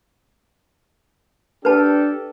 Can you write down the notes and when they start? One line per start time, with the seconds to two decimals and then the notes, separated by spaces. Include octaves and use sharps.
1.65 D4 G4 A4 B4 A5